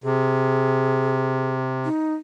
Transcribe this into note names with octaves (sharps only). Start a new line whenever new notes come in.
C3 G#4
D#4